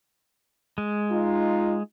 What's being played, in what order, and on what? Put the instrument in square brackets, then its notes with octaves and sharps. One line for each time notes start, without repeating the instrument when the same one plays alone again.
[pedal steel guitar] G#3
[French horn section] D#4 F4